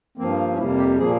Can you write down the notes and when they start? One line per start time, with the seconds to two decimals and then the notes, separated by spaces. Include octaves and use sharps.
0.18 G2 F3 A#3 C4
0.52 C#4
0.57 F2 C3 G3 A#3 E4
0.78 G4
0.98 A#2 F3 A#3 G#4